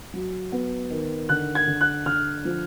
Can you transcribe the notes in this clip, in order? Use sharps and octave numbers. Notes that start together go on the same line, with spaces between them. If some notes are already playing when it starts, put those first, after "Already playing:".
F#3
B3
D#3
D3 F#6
G#6
D3
F#6
D3 F6
F3